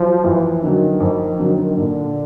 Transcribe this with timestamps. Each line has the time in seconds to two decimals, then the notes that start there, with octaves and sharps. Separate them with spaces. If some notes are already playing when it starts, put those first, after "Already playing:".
Already playing: F3 F#3
0.24 F2 E3
0.63 D3 D#3 F#3
1.00 F2
1.39 D3 F#3
1.77 A#2 D3